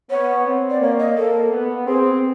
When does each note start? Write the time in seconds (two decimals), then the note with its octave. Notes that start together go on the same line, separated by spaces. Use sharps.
0.10 B3 C#5
0.46 C4
0.70 D5
0.81 A#3 C#5
0.99 D#5
1.16 A#3 A4
1.51 B3
1.87 C4 G#4